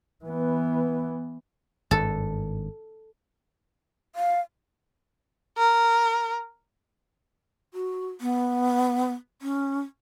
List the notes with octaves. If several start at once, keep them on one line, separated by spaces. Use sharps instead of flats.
E3 B3
G#1 G2 A4
F5
A#4
F#4
B3
C#4